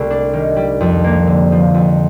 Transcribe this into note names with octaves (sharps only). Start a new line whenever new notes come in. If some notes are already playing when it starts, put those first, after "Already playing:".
Already playing: C2 A3
D4
D#3
G3
F2
A#3
D3
F3
F2